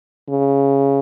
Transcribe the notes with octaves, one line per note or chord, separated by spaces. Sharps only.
C#3